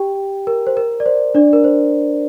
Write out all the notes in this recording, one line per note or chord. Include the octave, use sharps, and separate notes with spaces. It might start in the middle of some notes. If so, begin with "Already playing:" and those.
Already playing: G4 G5
A#4
C5
A#4
D5
C5
D4 D5
A#4
C5